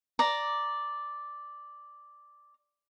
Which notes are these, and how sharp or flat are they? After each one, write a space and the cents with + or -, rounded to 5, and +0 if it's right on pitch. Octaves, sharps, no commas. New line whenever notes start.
D5 +0 A#5 +0